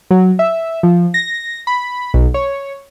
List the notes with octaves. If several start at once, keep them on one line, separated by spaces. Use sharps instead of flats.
F#3
E5
F3
A#6
B5
B1
C#5